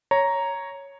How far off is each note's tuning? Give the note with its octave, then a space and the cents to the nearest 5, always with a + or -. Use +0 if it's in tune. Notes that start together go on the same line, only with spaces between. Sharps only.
C#5 +0 A#5 +0